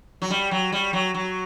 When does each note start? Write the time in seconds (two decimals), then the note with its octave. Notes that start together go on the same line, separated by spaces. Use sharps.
0.22 F#3
0.30 G3
0.51 F#3
0.72 G3
0.93 F#3
1.14 F#3